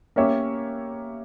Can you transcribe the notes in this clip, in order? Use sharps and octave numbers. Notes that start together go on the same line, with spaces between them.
A#3 C#4 G4 C#5 E5